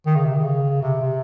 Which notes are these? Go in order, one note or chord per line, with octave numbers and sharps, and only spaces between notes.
D#3
C#3
C3
D#3
C#3
C3
C3